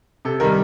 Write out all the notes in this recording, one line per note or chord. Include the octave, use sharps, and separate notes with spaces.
C3 A4
D#3 G3 A#4